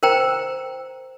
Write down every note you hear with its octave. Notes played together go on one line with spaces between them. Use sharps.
A#4 C5 G5 A#5